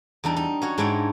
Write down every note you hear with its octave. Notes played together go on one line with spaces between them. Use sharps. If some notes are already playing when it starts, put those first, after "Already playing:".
E2 G3 D4 D#4
D#4
C#4 F#4 C#5
G#2 G#3 D4 E4 C#5 G5